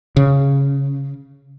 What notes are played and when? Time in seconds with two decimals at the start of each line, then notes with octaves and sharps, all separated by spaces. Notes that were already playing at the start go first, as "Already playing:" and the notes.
0.16 C#3